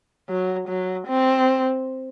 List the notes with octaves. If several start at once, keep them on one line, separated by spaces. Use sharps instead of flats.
F#3
F#3
C4